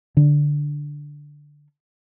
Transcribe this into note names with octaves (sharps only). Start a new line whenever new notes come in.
D3 D4